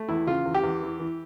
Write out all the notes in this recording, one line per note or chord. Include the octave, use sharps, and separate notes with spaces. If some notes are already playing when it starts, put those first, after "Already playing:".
Already playing: A3
E2 E4
C#3 F4
E2
G4
E2
E3
E3